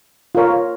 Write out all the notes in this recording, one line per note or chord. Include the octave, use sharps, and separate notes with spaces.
F4 A#4 C#5